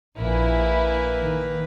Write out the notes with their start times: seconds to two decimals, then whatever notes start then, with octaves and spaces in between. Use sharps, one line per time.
0.19 A#1 A#3 E4 B4 G#5
1.20 D#3